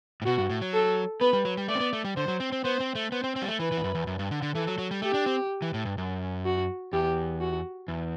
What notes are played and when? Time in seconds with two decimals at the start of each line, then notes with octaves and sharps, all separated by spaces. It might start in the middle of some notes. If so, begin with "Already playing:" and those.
0.22 A2
0.26 B2 F#4
0.38 G2
0.50 A2
0.61 F#3
0.74 A4
1.21 B3 B4
1.33 G3
1.45 F#3
1.57 G3
1.68 A3 D5
1.75 C4
1.80 B3
1.93 A3
2.05 G3
2.17 D3 C5
2.28 F#3
2.40 C4
2.52 C4
2.64 B3 C5
2.80 C4
2.95 A3
3.12 B3 C5
3.24 C4
3.36 C4
3.42 G3
3.48 A3
3.60 E3 B4
3.72 E3
3.78 E2
3.84 F#2
3.95 E2
4.07 F#2
4.19 G2
4.31 D3
4.42 D3
4.55 E3 A4
4.67 F#3
4.78 F#3
4.91 G3
5.02 A3 G4
5.14 D4
5.26 C4
5.62 E3
5.74 A2
5.85 G2
5.98 F#2
6.46 F#4
6.93 E2 G4
7.41 F#4
7.88 E2